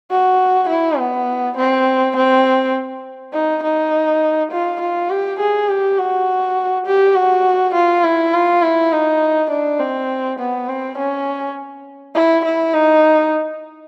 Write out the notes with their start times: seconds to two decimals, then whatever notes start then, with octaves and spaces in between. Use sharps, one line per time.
0.11 F#4
0.69 E4
0.99 B3
1.58 C4
2.16 C4
3.34 D#4
3.63 D#4
4.51 F4
4.81 F4
5.10 G4
5.39 G#4
5.69 G4
5.98 F#4
6.86 G4
7.16 F#4
7.74 F4
8.04 E4
8.34 F4
8.62 E4
8.92 D#4
9.51 D4
9.80 C4
10.39 B3
10.68 C4
10.98 C#4
12.15 E4
12.45 E4
12.74 D#4